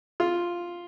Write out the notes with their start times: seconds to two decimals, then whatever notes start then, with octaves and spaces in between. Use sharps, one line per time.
0.20 F4